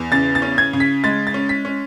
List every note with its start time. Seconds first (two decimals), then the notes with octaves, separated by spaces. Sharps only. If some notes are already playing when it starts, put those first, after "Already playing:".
Already playing: E2
0.12 C#3 A6
0.35 A6
0.42 C#4
0.58 G#6
0.73 C#3
0.80 B6
1.04 G#3 A6
1.27 A6
1.34 C#4
1.49 B6
1.65 C#4